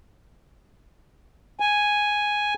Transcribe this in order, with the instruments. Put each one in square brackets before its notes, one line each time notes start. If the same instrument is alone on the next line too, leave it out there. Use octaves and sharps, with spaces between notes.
[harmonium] G#5